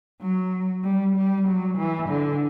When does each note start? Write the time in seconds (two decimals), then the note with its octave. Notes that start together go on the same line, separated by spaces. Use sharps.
0.21 F#3
0.84 G3
1.16 G3
1.48 F#3
1.78 E3
2.09 D3